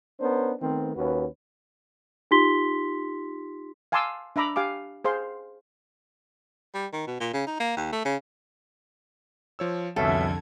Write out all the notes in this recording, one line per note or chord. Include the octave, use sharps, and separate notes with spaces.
B3 C#4 D4 A#4 C5
D#3 A3 B3 C4
D#2 C#4 F#4 B4
D#4 F4 G4 C6 B6 G7
F5 G#5 A5 C6 D6 E6
D4 E5 A#5 B5 D6
G4 F5 G#5 D6
G#4 C5 F5 C6
G3
D#3
B2
A#2
C#3
D#4
A#3
D#2
A3
C#3
F3 C#5 E6
C2 F2 B2 D3 C#4 A4 E5 G#6